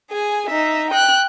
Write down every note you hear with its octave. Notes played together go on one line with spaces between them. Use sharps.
G#4 G#5
D#4 E5
G5 F#6